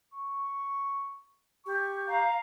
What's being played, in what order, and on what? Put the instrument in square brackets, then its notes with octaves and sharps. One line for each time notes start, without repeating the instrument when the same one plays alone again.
[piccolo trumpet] C#6
[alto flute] G4 [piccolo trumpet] C#6
[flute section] F5 A#5